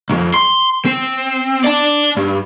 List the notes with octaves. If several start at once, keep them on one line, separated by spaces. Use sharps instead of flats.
B1 F2
C6
C4
D5 A5
G2